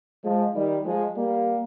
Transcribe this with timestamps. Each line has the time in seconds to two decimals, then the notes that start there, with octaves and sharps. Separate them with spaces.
0.25 F3 G#3
0.55 D#3 G3
0.85 F3 G#3
1.15 G3 A#3